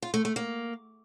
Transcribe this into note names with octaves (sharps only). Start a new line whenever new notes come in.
F4
A3
A3
A#3